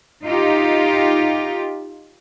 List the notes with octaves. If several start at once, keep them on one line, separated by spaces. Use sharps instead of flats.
D#4 F4 G4